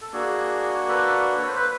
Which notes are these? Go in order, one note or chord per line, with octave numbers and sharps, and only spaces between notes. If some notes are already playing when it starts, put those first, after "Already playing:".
A4
A#3 D4 F#4 G#4
A4 B4
C#5
C5
B4